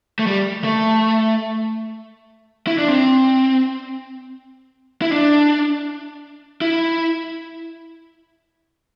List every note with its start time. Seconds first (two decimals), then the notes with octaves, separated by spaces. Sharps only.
0.19 A3
0.27 G3
0.64 A3
2.67 E4
2.78 D4
2.88 C4
5.02 E4
5.12 D4
6.61 E4